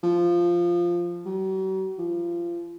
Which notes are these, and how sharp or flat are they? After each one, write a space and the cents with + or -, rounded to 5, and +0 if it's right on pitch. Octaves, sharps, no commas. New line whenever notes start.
F3 -5
F#3 +45
F3 -25